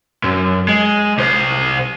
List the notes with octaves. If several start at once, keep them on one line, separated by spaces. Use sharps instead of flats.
F#2
G#3
C2 C5